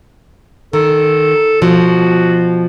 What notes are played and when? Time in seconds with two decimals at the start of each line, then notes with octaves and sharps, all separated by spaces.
0.73 D#3 A4
1.62 B2 F3 F#4